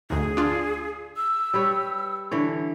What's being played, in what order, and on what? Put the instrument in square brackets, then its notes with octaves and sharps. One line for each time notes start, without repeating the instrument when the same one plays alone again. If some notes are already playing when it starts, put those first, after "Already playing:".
[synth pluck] D2 G#2 [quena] G#4
[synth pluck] D4 F4
[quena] E6
[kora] G3 B4 C#5
D3 E3 C#5